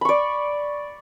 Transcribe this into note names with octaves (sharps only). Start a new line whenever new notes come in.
D5 B5 C#6